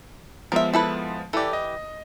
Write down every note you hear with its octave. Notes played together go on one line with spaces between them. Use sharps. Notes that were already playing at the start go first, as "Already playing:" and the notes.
F3 G#3 B3 A#4 E5
E4 A4 B4
E3 G4 A4 D5
D#5